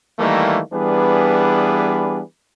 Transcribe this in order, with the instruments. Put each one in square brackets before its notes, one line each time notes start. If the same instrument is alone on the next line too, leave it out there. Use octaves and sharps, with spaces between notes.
[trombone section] D#3 E3 G3 A3 A#3
E3 G3 B3 D4 G#4 B4